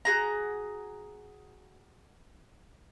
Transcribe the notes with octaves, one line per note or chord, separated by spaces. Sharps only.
F#4 G#4 A#5